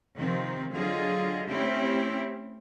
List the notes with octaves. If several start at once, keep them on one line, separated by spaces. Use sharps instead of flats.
C3 D#3 F3 C4
D3 F#3 F4 G#4 D#5
A3 C4 C#4 E4 G4